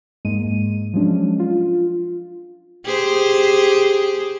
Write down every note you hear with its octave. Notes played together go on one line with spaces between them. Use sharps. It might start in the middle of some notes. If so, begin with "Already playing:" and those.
G#2 G#3 A#3 D#7
F3 F#3 G#3 C#4 D4
F4
G4 G#4 C5